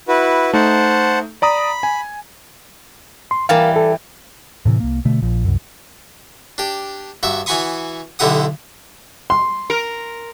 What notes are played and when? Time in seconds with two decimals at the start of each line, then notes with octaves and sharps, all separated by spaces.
0.08 E4 F#4 B4
0.54 A3 D#4 C5 F#5 A5
1.42 D5 A#5 B5 D#6
1.83 G#5
3.31 C6
3.49 E3 G3 A#4 F5 A5
3.76 A4
4.65 A2 C3 E3
4.80 C2 A#3
5.05 B2 D3 A3
5.22 A#1 F3
5.45 C2 F#2
6.58 D4 G4
7.23 G2 F#4 E5
7.46 E3 F#4 G#5 B5 C#6 D#6
8.19 B1 D3 E4 G4 F#5 D#6
9.30 C6
9.70 A#4